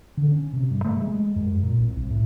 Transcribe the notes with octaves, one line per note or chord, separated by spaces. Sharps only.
D3
C#4
C3
G2
A3
G#3
F#2
A#2
C2
C2
A2